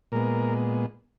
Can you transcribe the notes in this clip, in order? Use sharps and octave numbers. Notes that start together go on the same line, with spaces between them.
A#2 G#3 B3 A#4